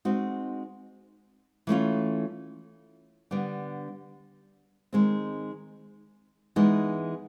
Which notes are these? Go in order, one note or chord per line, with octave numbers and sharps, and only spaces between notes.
G#3 C4 D#4 F#4
E3 A3 C#4 F4
D3 G3 B3 D4
D#3 G#3 C4
E3 G#3 B3 D#4